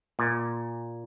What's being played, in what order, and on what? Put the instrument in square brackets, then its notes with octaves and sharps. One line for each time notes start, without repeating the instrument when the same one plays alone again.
[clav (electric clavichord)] A#2